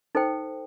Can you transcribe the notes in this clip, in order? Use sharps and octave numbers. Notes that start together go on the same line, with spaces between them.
D#4 A4 C5 G5